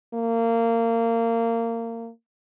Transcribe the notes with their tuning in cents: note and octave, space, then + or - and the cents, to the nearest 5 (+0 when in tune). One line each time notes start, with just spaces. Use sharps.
A#3 -25